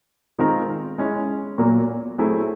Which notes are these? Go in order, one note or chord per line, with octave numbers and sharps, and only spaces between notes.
D#3 G#3 C4 F4 A#4
G#3 C#4 E4
A#2 F#3 A#3
F#3 A3 C4 E4 G#4